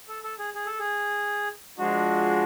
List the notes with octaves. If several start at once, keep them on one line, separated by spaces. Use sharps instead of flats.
A4
A4
G#4
G#4
A4
G#4
F3 G#3 D4 F#4